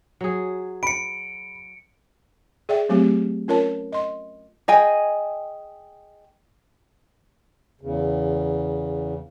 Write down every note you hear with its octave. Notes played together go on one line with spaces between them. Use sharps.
F#3 G#4
B5 C#7 D7
G#4 D5 E5 G5
F#3 A3 C4 G4
C#4 F4 A#4 C#5 A5
D#5 C6
G#4 D#5 G5 G#5
E2 C#3